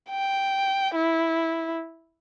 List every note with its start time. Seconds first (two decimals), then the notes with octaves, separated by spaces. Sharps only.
0.10 G5
0.96 E4